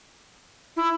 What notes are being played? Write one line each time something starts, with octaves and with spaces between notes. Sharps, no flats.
E4